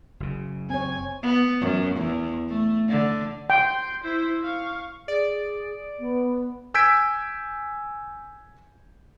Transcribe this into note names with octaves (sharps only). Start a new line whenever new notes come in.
F#1 C#3
C4 C#5 G#5
B3
F#2
E2
A3
D3
G5 C6 G6
E4 C5
F5 C#6
G#4 D5 D7
B3
G#5 E6 G6 G#6 B6 D7